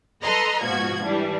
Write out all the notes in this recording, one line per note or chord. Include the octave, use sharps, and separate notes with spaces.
A4 B4 D#5 A#5 C6
G#2 B2 F3 F#4 G#6
E3 G3 D4